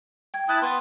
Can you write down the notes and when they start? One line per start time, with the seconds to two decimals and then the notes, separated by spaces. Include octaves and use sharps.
0.34 G5 G#6
0.49 E4 A5 D#6 F#6
0.62 B3 C6